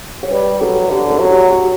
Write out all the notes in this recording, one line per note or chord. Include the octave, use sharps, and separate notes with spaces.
C#5
G3 B4
F#3 A4
D3 G4
A4
F#3
G4
F#4